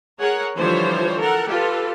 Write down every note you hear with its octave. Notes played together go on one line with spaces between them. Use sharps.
G#4 A#4 C#5 F#5
D3 E3 F3 G3 C5 C#5
A4 A#4 F#5
F4 G4 A4 B4